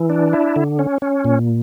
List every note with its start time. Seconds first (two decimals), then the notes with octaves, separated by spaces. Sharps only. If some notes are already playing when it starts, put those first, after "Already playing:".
Already playing: E3
0.10 D4
0.33 E4
0.56 D3
0.79 C#4
1.02 C#4
1.25 A#2